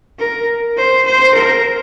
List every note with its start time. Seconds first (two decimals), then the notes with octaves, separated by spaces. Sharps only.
0.19 A#4
0.77 C5
1.06 C5
1.35 A#4